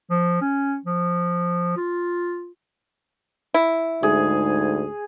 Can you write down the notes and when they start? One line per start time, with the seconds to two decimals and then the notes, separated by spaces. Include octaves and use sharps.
0.10 F3
0.41 C#4
0.85 F3
1.77 F4
3.54 E4
4.03 D2 G#2 G#4